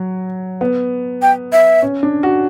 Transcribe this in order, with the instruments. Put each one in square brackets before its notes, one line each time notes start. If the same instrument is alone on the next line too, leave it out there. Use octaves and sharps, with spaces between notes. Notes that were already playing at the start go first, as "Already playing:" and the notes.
Already playing: [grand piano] F#3
B3
[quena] G5
E5
[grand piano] C#4
D4
F#4